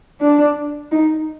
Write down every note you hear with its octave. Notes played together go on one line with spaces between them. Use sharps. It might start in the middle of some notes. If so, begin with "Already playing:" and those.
D4
D#4